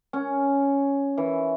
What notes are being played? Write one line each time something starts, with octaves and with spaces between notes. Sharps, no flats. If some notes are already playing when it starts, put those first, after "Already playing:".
C#4
E3